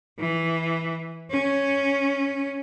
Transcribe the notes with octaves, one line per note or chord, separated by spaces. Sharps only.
E3
C#4